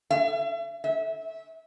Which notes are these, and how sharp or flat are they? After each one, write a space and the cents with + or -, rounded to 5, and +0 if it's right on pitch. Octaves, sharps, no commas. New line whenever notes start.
E5 +40
E5 -20